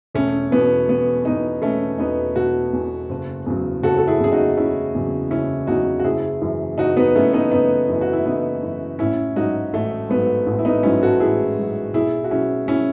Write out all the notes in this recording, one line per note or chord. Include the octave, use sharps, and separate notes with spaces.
E1 A3 C#4
E2 B2 B3
E1 B3
E2 B2 B3 D#4
E1 A3 C#4
E2 B2 B3 D#4
E1 F#4 A4
E2 B2
F#1
E2 C#3 F#3
F#1 F#4 A4
A4
E4 G#4
E2 C#3 F#3 G#4
D#4 F#4
F#1 C#4 E4
E2 C#3 F#3
F#1 C#4 E4
E2 C#3 F#3 D#4 F#4
F#4
F#1 E4 G#4
F#2 E3
F#1 D#4 F#4
B3 D#4
F#2 E3 A3 C#4
B3 D#4
F#1 B3 D#4
F#2 E3
F#4
E4
F#1 B3 D#4
F#2 E3
A1 C#4 E4
G#2 F#3 D#4 F#4
A1 A3
G#2 F#3 B3
A1
E4
B3 D#4
G#2 F#3 C#4 E4
F#4 A4
A1 E4 G#4
G#2 F#3
B1 E4 G#4
F#4
B2 F#3 C#4 E4
C#4 E4